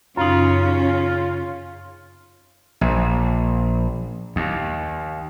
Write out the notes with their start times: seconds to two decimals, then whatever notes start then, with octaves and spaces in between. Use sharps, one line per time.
0.17 F#2 C#3 C#4 D#4 F4
0.58 F4
2.81 A#1
4.36 D#2